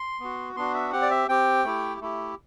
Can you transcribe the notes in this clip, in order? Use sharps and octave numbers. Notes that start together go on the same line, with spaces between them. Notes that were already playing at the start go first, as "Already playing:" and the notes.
Already playing: C6
B3 F#4
B3 D4 F#4 C6
E5
C4 G4 F#5
D5
E5
C4 G4 G5
A3 E4 G4
A3 E4 G4